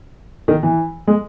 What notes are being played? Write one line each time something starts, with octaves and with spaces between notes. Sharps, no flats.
D#3
E3
G#3